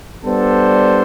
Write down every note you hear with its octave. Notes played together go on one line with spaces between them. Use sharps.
G3 B3 D4 A4 C5